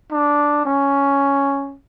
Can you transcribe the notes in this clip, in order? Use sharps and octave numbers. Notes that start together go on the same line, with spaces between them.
D4
C#4